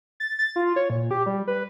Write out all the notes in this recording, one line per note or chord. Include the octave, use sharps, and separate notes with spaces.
A6
A6
F4
C#5
A#2
G4
G3
B4